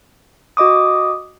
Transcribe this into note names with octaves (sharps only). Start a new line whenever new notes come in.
F#4 D#5 D6 D#6